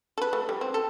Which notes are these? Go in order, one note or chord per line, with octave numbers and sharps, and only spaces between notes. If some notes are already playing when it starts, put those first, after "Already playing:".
A4 B4
A3
G3
C4
A4